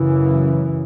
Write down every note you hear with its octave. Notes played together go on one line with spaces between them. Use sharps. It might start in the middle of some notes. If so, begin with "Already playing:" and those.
Already playing: F#2 C#3 E3